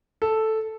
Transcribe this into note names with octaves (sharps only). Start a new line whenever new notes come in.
A4